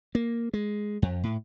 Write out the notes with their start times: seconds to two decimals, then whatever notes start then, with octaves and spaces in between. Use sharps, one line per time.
0.15 A#3
0.54 G#3
1.02 F2
1.23 A2